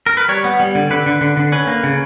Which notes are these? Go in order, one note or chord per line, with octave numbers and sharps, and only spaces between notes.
A#4
B4
G3 C#5
B3
G3
D3
D3 B4
D3
D3
D3
C#4 B4
A#3
C#3